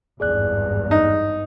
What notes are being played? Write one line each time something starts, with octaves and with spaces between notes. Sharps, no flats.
G#1 E2 G2 G#4 D5 F#6
D#4